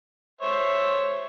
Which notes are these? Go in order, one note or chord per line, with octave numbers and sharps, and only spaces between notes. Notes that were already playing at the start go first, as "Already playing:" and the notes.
C5 C#5 E5